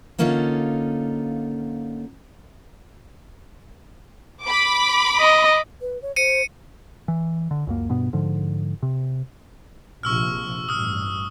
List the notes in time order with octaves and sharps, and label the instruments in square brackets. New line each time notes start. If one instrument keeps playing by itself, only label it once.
[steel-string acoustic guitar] D3 A#3 C#4 D#4 F4 A4
[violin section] B5 D6
[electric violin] D#5
[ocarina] B4
C#5
[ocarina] C5 [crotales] C#7 D#7
[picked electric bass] E3
D3
C#2 F#2 A#3
G2 B2 B3
G#2 D3 F3
C3
[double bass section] A#1 C3 F3 [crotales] C#6 E6 F6
[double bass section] A1 G2 [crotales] D#6 F6